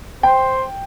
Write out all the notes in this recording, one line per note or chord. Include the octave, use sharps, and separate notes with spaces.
C5 G5